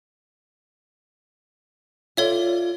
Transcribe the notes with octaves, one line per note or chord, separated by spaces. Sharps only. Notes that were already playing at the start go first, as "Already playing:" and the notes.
F4 A4 C#5 D5 E5